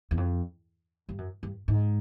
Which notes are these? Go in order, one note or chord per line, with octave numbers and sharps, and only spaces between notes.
E2
F2
G2
F#2
G2
G#2